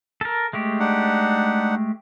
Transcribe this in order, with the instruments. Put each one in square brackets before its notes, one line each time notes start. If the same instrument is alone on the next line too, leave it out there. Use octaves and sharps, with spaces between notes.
[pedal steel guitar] A4 A#4
G#3 A3 G4
[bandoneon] D4 D#4 F#5